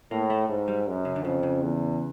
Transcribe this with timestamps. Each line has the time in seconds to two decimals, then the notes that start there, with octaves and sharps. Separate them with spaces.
0.11 A2 A#3
0.30 A3
0.49 G#2
0.68 G3
0.87 F#2
1.05 C#3
1.16 D3
1.24 F2 C#3
1.43 C#3
1.62 E2